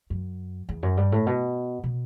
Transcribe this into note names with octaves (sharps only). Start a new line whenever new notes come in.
F#2
E2
F#2
G2
A2
B2
B2